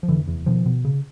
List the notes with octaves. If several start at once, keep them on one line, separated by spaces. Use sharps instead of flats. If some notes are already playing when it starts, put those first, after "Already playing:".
F3
F1 D3 E3
E2
B2 D#3 F3
B2
C#3